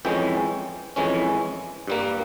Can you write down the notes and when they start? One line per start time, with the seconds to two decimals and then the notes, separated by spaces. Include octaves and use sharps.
0.05 F2 E3 G#3 C#4 G5
0.96 F2 E3 G#3 C#4
1.87 G2 G3 A#3